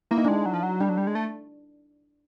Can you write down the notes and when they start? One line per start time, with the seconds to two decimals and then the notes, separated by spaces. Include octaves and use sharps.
0.11 A#3 E4
0.18 D#4
0.25 D4
0.28 G#3 D#4
0.46 F#3
0.54 F3
0.63 F#3
0.80 G3 D4
0.89 F#3
0.98 G3
1.07 G#3
1.15 A3